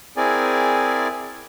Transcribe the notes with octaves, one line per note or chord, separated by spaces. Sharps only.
C4 E4 G#4 A#4 D5 G#5